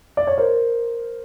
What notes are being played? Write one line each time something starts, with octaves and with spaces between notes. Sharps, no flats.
D5
C#5
A#4 C5